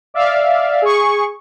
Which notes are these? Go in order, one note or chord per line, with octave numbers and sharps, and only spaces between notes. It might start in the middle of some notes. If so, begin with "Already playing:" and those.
D5 E5 F5
G#4 C#6